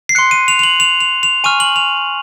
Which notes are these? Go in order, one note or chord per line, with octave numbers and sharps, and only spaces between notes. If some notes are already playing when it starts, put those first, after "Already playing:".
C7
C6 F#6 C#7
D#7
F7
F7
F#7
F7
F7
F7
G#5 C#6 F6 D#7
F#7
F7